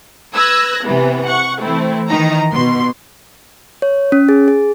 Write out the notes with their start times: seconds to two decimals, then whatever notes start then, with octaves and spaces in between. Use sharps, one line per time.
0.33 B4 E6 F#6 G#6 A#6
0.83 C3 E3 B3
1.26 F#5 C#6
1.61 E3 A3 C4 E4
2.08 D#3 E3 D#4 A#5
2.52 B2 C6
3.82 C#5
4.12 C#4
4.29 G#4
4.48 G#4